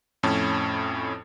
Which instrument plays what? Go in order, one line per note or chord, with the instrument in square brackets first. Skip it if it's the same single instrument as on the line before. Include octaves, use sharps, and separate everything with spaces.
[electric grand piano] F2 A2 C#4 A5